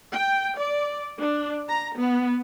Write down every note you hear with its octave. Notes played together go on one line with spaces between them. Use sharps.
G5
D5
D4
A#5
B3